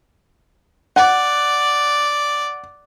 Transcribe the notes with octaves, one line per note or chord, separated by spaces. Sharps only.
D5 F#5